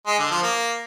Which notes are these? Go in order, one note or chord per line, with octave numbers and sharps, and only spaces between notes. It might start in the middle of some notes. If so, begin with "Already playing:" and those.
G#3
D3
F3
A#3